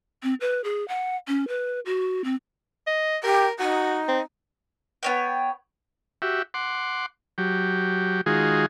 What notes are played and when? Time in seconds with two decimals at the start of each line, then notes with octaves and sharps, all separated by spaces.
0.23 C4
0.41 B4
0.64 G#4
0.88 F#5
1.28 C#4
1.48 B4
1.86 F#4
2.24 C4
2.87 D#5
3.24 G4 A#4
3.59 D#4 F#4
4.08 C4
5.03 B3 C#5 G5
6.22 F#4 G4 E5
6.54 F#5 C6 D6
7.38 F#3 G4
8.26 D#3 G#3 F4 F#4 G#4